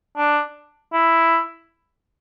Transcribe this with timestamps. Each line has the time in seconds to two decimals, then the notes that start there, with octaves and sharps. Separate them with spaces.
0.17 D4
0.93 E4